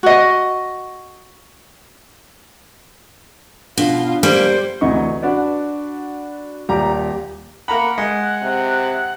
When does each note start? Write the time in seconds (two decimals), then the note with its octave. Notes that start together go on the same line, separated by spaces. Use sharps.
0.03 F#4 D#5
3.77 B2 D4 F4
4.23 G3 A#3 C5
4.81 D2 C3 E3 D#4 D#5 C#6
5.23 D4 F#4 B4 D5
6.69 D#1 G3 F4 G4 A#5 D6
7.68 A#3 F#5 A#5 B5
7.98 G#3
8.42 C3